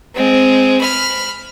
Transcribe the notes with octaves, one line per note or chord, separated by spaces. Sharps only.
G#3 C4
B5 F6